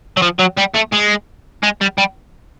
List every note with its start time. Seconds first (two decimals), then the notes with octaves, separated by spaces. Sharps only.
0.17 F#3
0.22 F3
0.39 F#3
0.58 G3
0.75 A3
0.93 G#3
1.63 G#3
1.81 G3
1.98 G3